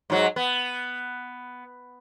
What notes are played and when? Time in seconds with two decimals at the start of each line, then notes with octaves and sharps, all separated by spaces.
0.10 G#2 F#3
0.36 B3